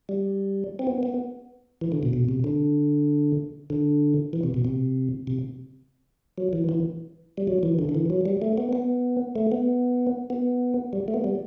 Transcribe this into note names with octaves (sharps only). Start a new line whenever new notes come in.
G3
C4
B3
B3
E3
D3
B2
B2
C3
D3
D3
E3
C3
B2
C3
C3
F#3
E3
E3
G3
F#3
E3
D3
D3
E3
F#3
G3
A3
B3
B3
A3
B3
B3
G3
A3
B3
G3